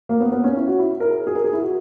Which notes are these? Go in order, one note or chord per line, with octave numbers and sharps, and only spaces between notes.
A#3
B3
B3
C#4
E4
F#4
E4
A#4
G#4
G#4
A#4
G#4
E4
F#4